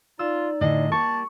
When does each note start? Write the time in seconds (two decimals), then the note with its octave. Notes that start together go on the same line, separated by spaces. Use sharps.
0.19 D#4 F4 D5 E6
0.61 A2 D3 G#4 D#5
0.92 A#3 G4 D5 A5 C#6